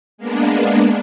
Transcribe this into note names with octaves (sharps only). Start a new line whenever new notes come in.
G#3 A#3 B3 D4